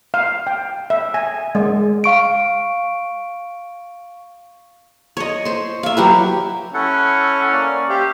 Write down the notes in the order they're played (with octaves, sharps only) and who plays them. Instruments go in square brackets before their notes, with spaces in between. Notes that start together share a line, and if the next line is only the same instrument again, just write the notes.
[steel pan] F5
G5
E5
G#5
G#3
[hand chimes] F5 C#6 D7
[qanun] C#5 D#5
C5 C6
E5 F5
F#3 G4 B4
[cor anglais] C#4 [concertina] E4 A4 F#5
[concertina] A#3 D5
[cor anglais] G4 [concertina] C5 E5 F5